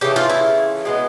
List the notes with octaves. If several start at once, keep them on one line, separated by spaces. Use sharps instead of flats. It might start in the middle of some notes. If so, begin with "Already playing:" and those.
C#3 E3 A3 G4
F4
E4
B2 G#3 B3